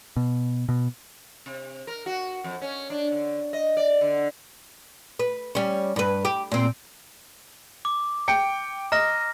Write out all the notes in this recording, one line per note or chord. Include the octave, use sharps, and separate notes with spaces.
B2
B2
C3
A#4
F#4
F2
C#4
D4
D3
D#5
D5
D3
B4
G3 C#4
G2 B4
G4
A#2 C4
D6
G5 C#7
D#5 A#5 F6 A#6